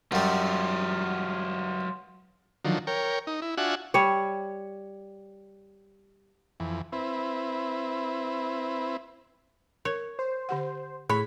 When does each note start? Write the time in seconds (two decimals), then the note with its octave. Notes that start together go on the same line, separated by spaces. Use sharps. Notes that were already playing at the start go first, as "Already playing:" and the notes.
0.12 F#2 F#3 G3 F4
2.65 D3 D#3 F3 F#3
2.87 A#4 C#5 G5
3.27 D#4
3.42 E4
3.57 D4 F4 F#4 E5 F#5 G#5
3.94 G3 C#5
6.60 F2 E3
6.92 C4 E4 B4
9.85 A#4 C#5
10.19 C5
10.49 D3 G4 F#5
11.10 A2 G#4 C#5 B5